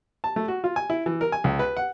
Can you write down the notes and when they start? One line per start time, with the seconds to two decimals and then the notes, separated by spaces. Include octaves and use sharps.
0.24 A5
0.36 A3
0.48 F#4
0.64 F4
0.76 G#5
0.90 E4
1.06 E3
1.21 A#4
1.32 G#5
1.44 C#2
1.59 B4
1.77 F#5